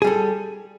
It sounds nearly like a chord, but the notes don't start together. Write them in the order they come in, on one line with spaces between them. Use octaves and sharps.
G#4 G3 A4